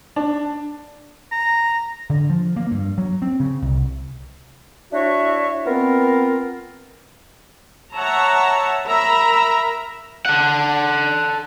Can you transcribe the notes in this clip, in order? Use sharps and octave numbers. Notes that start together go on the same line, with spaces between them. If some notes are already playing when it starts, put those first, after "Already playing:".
D4
A#5
D3
F3
A#3
G2
F#3
C4
C#3
C2
D4 E4 F#4 C#5 E5
B3 C4 F4 A#4
C#5 E5 F#5 A5 A#5
A#4 E5 A#5 B5
A4 F#5